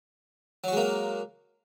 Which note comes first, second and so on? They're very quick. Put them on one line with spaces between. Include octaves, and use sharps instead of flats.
F#3 F#4 G#3 A#3